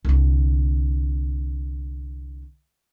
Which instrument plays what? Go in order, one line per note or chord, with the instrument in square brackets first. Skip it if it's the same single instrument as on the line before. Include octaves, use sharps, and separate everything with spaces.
[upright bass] C2 D3